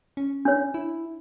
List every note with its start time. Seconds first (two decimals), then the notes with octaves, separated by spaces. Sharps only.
0.17 C#4
0.45 D4 C#5
0.74 E4